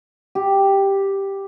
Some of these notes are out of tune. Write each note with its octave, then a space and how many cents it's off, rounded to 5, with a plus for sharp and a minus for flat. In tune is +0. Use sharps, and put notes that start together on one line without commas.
G4 +0